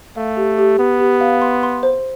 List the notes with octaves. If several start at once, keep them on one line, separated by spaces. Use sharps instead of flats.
A3 F5
G4
G4
B3 G4
G4
F5
C6
C6
C5